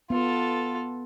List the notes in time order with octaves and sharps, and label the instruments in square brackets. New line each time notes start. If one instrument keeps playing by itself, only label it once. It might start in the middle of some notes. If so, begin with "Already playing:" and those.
[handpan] B3 [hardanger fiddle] F4 A4